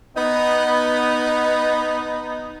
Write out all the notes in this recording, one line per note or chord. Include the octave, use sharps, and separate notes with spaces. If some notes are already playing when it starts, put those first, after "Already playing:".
B3 D#4